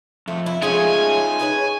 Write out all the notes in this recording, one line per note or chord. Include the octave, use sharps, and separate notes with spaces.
F2 A3
E4
G#3 A3 C#4 D#4 F4 G#5
G#4 B4 C#5